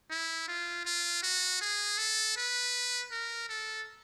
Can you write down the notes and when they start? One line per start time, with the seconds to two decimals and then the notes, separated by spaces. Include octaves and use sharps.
0.10 E4
0.48 F4
0.85 F4
1.23 F#4
1.61 G#4
1.98 A4
2.37 B4
3.12 A#4
3.49 A4